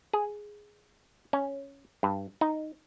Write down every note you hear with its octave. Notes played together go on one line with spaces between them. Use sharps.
G#4
C#4
G2
D#4